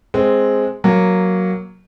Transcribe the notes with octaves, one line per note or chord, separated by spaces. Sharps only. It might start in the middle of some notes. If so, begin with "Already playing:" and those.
G#3 C4
F#3 A#3